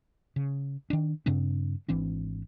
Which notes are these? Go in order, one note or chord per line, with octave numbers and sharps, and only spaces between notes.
C#3
D#3 D4
G2 C#3 C4 D4
G#1 E3 C4 D4